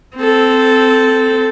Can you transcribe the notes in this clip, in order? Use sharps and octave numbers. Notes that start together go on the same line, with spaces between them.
C4 A4